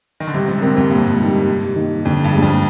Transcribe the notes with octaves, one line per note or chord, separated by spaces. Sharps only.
D#3
D3
G#2 C3 G3
G#2 C3
D3
G#2 C3 C4 G4 A#4
F2 G#2
G2 A#2
G3 A#3 D#4 G4
C3
D#3 A#3
F2 D3
G2
G#3 D4 G#4
F2